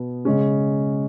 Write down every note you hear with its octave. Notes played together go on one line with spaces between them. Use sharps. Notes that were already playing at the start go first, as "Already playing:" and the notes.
Already playing: B2 B3
C#3 G#3 C#4